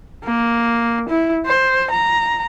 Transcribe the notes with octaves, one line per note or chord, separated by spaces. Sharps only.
A#3
E4
C5
A#5